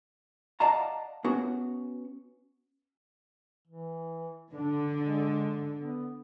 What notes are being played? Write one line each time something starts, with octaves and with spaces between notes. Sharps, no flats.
D5 D#5 F5 F#5 A5 A#5
B3 C#4 F#4
E3
D3 D4
G#3
B3